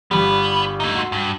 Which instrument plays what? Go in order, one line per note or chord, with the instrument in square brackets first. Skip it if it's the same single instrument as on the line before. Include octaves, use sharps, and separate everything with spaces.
[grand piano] G1 G3 [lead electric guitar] B3 B4
[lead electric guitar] A3 D#4
[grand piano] F#4 C6
[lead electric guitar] G2